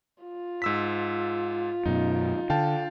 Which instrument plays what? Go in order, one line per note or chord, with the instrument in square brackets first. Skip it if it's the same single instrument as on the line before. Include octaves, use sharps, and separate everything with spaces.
[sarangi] F4
[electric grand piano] G#2 E6 B6
[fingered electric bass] F#2 B2 [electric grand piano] D#4
[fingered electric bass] D3 [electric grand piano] F5 G5 A5